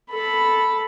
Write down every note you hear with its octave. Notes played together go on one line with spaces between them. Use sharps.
A4 B5